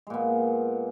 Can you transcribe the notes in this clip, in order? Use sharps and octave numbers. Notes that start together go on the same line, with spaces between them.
A#2 G#3 B3